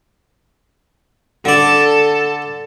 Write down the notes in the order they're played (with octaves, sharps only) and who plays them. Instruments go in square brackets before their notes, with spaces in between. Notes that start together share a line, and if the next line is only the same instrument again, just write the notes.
[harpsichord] D3 D5 [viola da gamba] A4